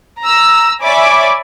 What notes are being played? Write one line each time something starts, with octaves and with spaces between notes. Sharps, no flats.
A#5 E6
C#5 D5 E5 G#5 B5 D6